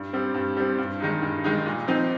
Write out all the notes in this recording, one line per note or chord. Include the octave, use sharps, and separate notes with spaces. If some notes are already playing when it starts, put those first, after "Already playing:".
Already playing: G2
G3 C4
G2
G3 C4
G2
D#3 G#3 D#4
G2
D#3 G#3 D#4
A#2
F3 C4 D#4